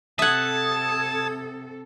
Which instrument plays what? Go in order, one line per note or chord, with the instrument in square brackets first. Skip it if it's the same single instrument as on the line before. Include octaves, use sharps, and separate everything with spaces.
[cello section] C3 A4 [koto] E5 F#5 [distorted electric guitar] A5 [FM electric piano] D#6 G#6